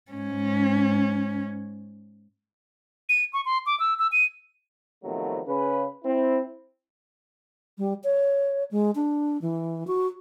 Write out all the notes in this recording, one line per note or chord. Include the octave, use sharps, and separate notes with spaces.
G#2 C#4
D#7
C#6
C6
D6
E6
E6
D#7
C3 D#3 F3 F#3 A3 B3
C#3 C#4 B4
C4 E4
G3
C#5
G#3
D4
E3
F#4